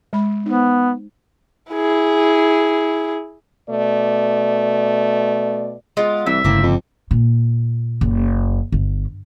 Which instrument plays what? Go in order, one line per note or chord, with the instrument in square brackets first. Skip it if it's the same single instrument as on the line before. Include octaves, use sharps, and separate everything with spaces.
[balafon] G#3 B5
[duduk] B3 [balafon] D#4 C5
[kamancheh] E4 G#4
[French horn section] B2 A3 D5
[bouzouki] G#3 B3 F4
[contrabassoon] C2 [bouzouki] E3 [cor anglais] E5
[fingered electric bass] G1 C#3 [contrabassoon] A2 [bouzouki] A#3 C4
[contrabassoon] F2
[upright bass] A#2
F#1
G1